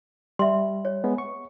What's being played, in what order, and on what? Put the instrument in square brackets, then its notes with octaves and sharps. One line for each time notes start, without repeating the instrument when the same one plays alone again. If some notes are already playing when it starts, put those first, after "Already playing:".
[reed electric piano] G3 [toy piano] E5 C6
[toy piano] C#5
[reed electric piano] G#3 B3
C#6